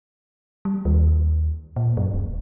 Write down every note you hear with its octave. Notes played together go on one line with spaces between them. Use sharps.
G3
D#2
A#2
F#2
D1